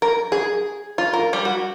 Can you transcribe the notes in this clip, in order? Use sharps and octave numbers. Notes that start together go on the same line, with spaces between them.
A#4
G#4
F4
A#4
G3
F#4